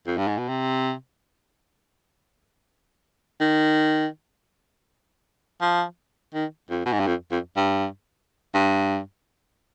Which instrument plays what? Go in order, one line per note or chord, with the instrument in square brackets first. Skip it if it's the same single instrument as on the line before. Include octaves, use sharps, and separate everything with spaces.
[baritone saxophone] F2
G2
G#2
B2
C3
D#3
F3
D#3
F2
B2
G#2
G2
F2
F2
G2
G2